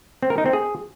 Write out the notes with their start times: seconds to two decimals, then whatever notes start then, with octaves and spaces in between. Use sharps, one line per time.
0.23 C4
0.30 A#4
0.38 D#4
0.46 C4
0.53 G#4